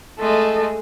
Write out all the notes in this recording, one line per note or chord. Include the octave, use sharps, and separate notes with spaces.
G#3 A3 A4 D#5